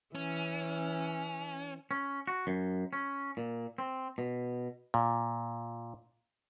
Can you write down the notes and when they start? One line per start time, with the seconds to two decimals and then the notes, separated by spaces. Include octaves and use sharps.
0.15 E3 C#4
1.91 C#4
2.27 F#4
2.47 F#2
2.93 C#4
3.37 A#2
3.78 C4
4.18 B2
4.94 A#2